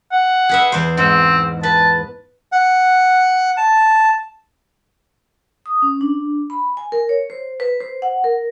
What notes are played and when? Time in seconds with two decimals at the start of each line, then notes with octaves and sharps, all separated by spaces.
0.12 F#5
0.49 G#4 B4 E5
0.72 E2 C5
0.97 G#2 C4
1.63 B4 A5
2.52 F#5
3.57 A5
5.66 D#6
5.82 C#4
6.01 D4
6.50 B5
6.77 G#5
6.92 A#4
7.09 C#5
7.30 C5
7.60 B4
7.81 C5
8.02 F#5
8.24 A#4